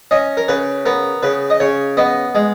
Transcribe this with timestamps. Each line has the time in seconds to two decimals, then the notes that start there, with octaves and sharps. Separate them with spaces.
0.11 C#4 D#5
0.37 A#4
0.48 C#3 B4
0.86 B3 A#4
1.22 C#3 B4
1.50 D#5
1.60 C#3 C#5
1.97 B3 D#5
2.35 G#3